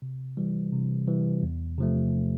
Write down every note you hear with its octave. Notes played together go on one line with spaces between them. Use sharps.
C3
E3 G3
C3
E3 G3
E2
C3 F3 A3